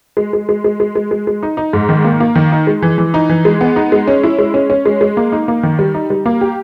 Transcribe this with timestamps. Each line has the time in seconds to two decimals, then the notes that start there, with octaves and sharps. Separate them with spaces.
0.17 G#3
0.33 G#3
0.49 G#3
0.64 G#3
0.80 G#3
0.95 G#3
1.11 G#3
1.27 G#3
1.43 D#4
1.57 D#4
1.73 G#2
1.89 D#3
2.04 A#3
2.20 A#3
2.36 D#3
2.52 D#4
2.67 G#3
2.82 E3
2.98 E3
3.14 D#4
3.29 E3
3.45 G#3
3.61 B3
3.76 D#4
3.92 G#3
4.08 C#4
4.23 E4
4.39 G#3
4.54 C#4
4.70 C#4
4.86 G#3
5.01 G#3
5.17 A#3
5.32 D#4
5.48 A#3
5.63 D#3
5.79 G3
5.94 D#4
6.10 G3
6.26 A#3
6.41 G4